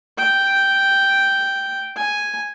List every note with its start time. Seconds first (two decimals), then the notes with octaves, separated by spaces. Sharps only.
0.18 G5
1.97 G#5